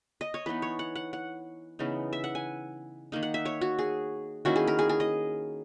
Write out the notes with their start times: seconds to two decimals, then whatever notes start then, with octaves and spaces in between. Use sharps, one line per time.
0.21 D#5
0.34 C#5
0.46 E3 B3 D#4 B4
0.62 C#5
0.79 F#5
0.95 F#5
1.13 F#5
1.79 C#3 E3 B3 D#4
2.13 E5
2.24 F#5
2.35 G#5
3.12 D#3 A#3 D#4
3.23 F#5
3.34 E5
3.45 C#5
3.61 F#4
3.79 G#4
4.45 D#3 A#3 C#4 E4 F#4
4.56 G#4
4.67 A#4
4.79 G#4
4.89 G#4
5.00 D#5